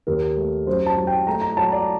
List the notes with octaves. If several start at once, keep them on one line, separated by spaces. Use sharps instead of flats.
D#2 A#4
A3
F#2 C5
A5
F#3
G5
A3 A#5
A#5
F#3 A5
D5